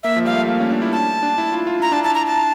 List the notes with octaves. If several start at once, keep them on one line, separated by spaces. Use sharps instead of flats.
A#3 E5
F3
G3 F5
A3
A#3
C#4
D4
E4
A5
D4
E4
F4
F4
E4 A#5
D4 A5
E4 A5
A#5
A5